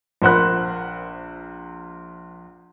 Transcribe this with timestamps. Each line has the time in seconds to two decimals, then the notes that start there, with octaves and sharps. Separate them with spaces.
0.22 A#1 A#4 C5 F#5 B5 F#6